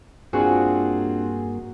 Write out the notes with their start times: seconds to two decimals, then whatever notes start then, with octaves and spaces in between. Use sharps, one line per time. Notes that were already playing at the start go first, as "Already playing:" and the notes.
0.33 G2 A#3 C4 D4 F4 F#4 G#4